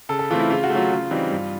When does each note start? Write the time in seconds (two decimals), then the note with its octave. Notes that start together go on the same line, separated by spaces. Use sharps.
0.09 C#3 A4
0.19 A4
0.31 E3 A3 C4 F4
0.39 E4
0.50 C#3 F4
0.64 F#4
0.70 A3
0.75 F#3 F4
0.91 C#3
1.11 E3 G3 C4 D#4
1.31 G2